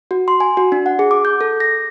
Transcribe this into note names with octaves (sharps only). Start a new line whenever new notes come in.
F#4
C6
G#5
F#4
D4
F#5
G#4
D6
G6
A4
A#6